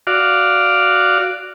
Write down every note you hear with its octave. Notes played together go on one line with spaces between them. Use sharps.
F#4 D5 F5